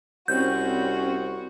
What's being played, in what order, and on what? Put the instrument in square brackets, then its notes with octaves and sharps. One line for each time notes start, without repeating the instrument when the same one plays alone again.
[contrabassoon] C2 [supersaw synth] C4 C#4 [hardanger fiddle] F#4 [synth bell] G6